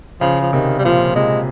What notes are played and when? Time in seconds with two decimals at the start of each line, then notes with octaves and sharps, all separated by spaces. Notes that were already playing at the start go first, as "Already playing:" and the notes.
0.21 C#3 F3
0.41 F3
0.52 C3 D#3
0.79 G3
0.85 A#2 F3
1.16 C3 G#3